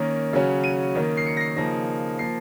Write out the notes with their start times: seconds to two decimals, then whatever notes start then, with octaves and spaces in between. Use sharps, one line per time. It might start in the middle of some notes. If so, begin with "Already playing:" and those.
Already playing: D#3 A#3 C#4
0.33 C#3 F#3 C#4
0.64 D#7
0.95 D#3 A#3 C#4
1.17 C7
1.26 C#7
1.37 A#6
1.41 C7
1.56 C#3 F3 A#3 D#4 A#6
2.18 F3 A#3 C7